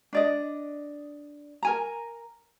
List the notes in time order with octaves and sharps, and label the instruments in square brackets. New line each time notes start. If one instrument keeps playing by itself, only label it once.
[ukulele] D4 D5 D#5
A#4 G#5 A#5